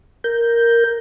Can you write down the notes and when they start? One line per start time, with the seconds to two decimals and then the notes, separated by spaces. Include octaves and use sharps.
0.24 A#4 G6